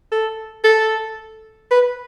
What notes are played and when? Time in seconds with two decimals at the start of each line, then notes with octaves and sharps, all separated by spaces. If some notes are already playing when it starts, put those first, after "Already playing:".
0.12 A4
0.64 A4
1.71 B4